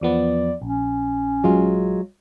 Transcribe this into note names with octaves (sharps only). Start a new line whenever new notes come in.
E2 F3 B3 D5
A#1 C#4
F#3 G#3 F4